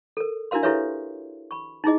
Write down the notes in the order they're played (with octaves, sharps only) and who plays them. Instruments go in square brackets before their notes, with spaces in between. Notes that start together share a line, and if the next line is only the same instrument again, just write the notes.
[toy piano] A4 A#4
D4 E4 F#4 A#4 F5 C6
E4 G4 A4 B4 C#5 E5
B5 C#6
D#4 E4 G#4 D#5